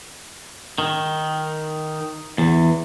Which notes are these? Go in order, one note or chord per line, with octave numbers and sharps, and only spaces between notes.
D#3
E2